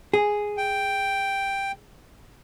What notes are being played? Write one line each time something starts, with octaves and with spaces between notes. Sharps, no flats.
G#4
G5